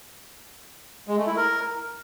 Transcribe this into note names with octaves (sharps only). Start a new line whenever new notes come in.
G#3
A3
E4
A#4